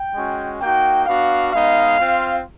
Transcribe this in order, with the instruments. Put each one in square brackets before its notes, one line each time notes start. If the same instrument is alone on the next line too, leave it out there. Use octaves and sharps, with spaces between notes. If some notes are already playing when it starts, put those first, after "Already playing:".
Already playing: [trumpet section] G5
G#3 C#4 F#4
A#3 D#4 F#4 G5
B3 D4 F#4 F5
G#3 B3 D#4 F5
C4 F4